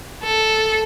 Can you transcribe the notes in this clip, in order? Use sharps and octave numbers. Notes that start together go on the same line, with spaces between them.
A4